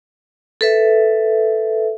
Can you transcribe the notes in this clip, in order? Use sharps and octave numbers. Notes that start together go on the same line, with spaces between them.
A4 B4 E5